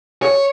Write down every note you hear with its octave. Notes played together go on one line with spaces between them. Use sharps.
C#5